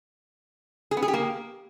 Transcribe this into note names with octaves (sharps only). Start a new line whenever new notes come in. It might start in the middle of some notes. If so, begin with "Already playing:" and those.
G#4
B3
G#4
G4
A#3